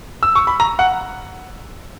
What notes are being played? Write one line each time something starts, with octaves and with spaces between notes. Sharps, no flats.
E6
C#6
B5
A#5
F#5